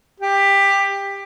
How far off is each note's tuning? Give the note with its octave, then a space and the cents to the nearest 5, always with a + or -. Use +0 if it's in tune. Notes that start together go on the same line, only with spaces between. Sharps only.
G4 +15